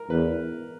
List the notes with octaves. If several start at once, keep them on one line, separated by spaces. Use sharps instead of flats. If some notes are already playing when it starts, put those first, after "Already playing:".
Already playing: A#4
E2 B4